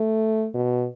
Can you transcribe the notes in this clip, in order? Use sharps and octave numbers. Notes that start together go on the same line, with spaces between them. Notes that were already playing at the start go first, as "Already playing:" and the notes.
Already playing: A3
B2